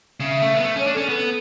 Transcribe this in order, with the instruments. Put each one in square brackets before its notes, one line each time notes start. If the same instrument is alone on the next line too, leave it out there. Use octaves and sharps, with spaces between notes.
[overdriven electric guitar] C#3 [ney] E5
[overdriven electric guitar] A3
B3
A3
[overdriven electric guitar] C#4 [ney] C#5
[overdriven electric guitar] D4
[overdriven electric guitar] C#4 [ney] A4
[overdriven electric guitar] B3 [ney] A4